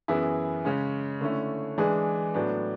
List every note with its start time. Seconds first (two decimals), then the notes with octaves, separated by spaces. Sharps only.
0.08 F#2 E3 B3 E4 G#4
0.65 C#3 G#3 C#4
1.21 D3 A3 C#4 E4
1.78 E3 G#3 D4 G#4
2.34 A2 F#3 B3 D4